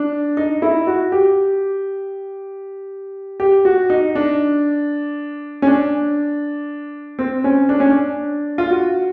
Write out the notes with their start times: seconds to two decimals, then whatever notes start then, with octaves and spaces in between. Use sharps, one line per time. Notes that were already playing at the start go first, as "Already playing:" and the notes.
Already playing: D4
0.37 D#4
0.62 E4
0.87 F#4
1.12 G4
3.40 G4
3.65 F#4
3.90 D#4
4.15 D4
5.62 C#4
5.67 D4
7.19 C4
7.44 C#4
7.69 D4
7.80 C#4
7.90 D4
8.58 F4
8.70 F#4